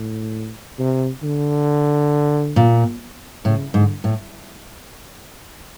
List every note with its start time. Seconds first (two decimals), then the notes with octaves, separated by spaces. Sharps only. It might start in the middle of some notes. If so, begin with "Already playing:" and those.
Already playing: A2
0.79 C3
1.23 D3
2.56 A#2
3.45 A2 C#3
3.74 G#2 D3
4.04 A2